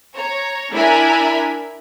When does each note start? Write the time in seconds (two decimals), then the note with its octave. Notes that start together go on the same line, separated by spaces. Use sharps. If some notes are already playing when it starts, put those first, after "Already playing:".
0.15 C#5 A#5
0.71 D4 E4 A#4 E5 G#5 B5